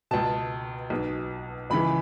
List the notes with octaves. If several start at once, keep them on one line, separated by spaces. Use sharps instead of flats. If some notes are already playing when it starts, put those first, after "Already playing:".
C#2 B2 A5
B1 B2
C#2 C#3 E3 B5